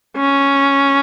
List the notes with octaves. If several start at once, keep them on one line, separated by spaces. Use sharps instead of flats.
C#4